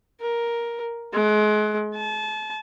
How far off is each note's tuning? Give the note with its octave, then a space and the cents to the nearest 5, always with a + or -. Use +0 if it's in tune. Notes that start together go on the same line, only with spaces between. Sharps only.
A#4 +10
G#3 +35
A5 -30